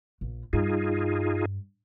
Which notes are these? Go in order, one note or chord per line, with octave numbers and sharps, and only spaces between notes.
A#1
G2 D#4 F4 G#4